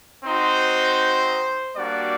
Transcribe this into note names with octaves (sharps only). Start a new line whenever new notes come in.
C4 D#4 F#4 C5
G3 A#3 D4 F#4 D5